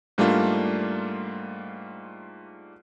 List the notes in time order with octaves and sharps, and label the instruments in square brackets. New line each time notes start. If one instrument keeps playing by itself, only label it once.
[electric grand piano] G#2 G3 A3 A#3 D4 F4